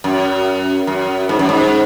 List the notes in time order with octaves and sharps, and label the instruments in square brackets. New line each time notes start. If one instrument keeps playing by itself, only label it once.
[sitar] F#2
F#2
G#2
F#2
G#2